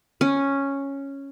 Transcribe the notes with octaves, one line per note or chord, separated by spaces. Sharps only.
C#4